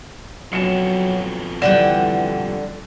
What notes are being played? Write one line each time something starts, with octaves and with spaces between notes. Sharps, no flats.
F2 B2 F#3 C#7 E7
D3 E3 G3 F#5 G5 E7